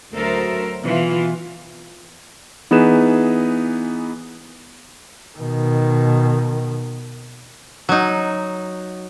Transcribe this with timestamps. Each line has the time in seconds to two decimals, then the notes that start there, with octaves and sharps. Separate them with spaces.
0.12 D2 F#3 A4 A#4 C5 E5
0.82 B2 E3 F4
2.71 E3 B3 D#4 G#4 B4 E7
5.38 B2 D#3
7.89 F#3 D#4